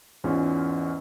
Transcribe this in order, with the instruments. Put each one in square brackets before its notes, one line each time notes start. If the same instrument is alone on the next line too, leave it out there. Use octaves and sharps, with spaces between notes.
[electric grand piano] E2 G#2 C#4 F4